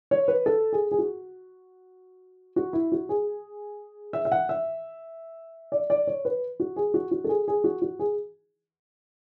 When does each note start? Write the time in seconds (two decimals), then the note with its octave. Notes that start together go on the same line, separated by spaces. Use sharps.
0.11 C#5
0.28 B4
0.46 A4
0.73 G#4
0.91 G#4
0.98 F#4
2.56 F#4
2.73 E4
2.92 F#4
3.09 G#4
4.13 E5
4.25 E5
4.32 F#5
4.49 E5
5.72 D5
5.90 D5
6.07 C#5
6.25 B4
6.60 F#4
6.76 G#4
6.94 F#4
7.11 F#4
7.24 A4
7.29 G#4
7.48 G#4
7.64 F#4
7.82 F#4
7.99 G#4